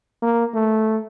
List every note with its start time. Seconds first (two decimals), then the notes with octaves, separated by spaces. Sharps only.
0.22 A#3
0.54 A3